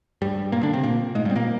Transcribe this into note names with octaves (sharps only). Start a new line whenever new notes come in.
G2 G3
A#2 A#3
D3 D4
C3 C4
A#2 A#3
G#2 G#3
G2 G3
C4
A#2 A#3